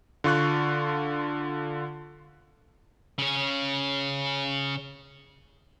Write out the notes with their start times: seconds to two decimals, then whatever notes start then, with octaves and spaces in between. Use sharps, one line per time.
0.24 D3 F4 C#6 F#6
3.18 C#3 C#4